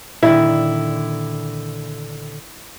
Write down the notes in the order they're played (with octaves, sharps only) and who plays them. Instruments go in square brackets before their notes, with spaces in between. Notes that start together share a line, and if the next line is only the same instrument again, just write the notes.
[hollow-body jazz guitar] A#2 D3 D#3 [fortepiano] E4